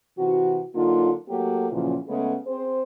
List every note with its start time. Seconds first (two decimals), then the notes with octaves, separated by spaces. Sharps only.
0.18 C3 E3 F#4
0.75 D3 F#3 A#3 D#4 F4
1.29 F#3 A3 A#3 G4
1.71 F#2 A#2 C#3 E3 F3
2.08 C#3 G#3 A3 B3
2.47 C4 G#4 C5